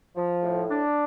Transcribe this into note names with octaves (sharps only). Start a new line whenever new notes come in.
F3
A2
D4